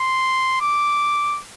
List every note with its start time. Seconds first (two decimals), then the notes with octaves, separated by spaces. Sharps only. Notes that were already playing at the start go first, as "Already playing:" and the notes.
Already playing: C6
0.61 D6